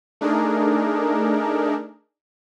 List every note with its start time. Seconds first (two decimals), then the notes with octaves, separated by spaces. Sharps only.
0.21 A3 D4 D#4 G#4 A#4